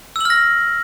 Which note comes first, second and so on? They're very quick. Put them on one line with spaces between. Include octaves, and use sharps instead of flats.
E6 F#7 F6 A#6